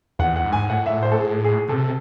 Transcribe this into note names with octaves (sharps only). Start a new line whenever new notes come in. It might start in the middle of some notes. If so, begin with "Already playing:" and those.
E2 F#5
F#5
G#2
G#5
A2 F#5
E5
C5
A4
G#4
G#4
C3 A4